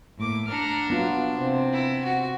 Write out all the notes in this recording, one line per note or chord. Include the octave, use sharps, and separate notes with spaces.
A2 A#3 D6
D4 F#5 A#5 F6
F#3 A#3 B3 F4
C3 C4
E4
F#4